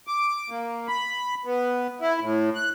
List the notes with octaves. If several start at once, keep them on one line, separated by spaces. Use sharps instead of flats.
D6
A#3
B5
B3
E4
A2
F#6